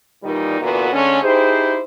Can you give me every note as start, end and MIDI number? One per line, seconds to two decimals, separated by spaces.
0.23 0.58 46
0.23 0.58 51
0.23 0.58 52
0.23 0.58 55
0.23 0.58 63
0.60 0.88 46
0.60 0.88 50
0.60 0.88 52
0.60 0.88 58
0.60 0.88 59
0.60 0.88 66
0.92 1.20 50
0.92 1.20 56
0.92 1.20 57
0.92 1.20 61
1.22 1.79 63
1.22 1.79 64
1.22 1.79 67
1.22 1.79 68
1.22 1.79 72